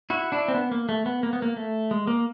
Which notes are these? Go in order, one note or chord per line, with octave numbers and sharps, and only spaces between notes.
E4 F#4
D4 E4
C4
B3
A#3
A3
B3
A#3
B3
A#3
A3
G#3
A#3